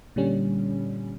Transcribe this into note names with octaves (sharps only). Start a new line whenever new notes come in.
A#2 D3 G3 C#4